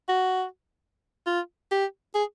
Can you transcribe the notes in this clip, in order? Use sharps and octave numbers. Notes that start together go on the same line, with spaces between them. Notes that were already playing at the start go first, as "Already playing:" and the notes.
F#4
F4
G4
G#4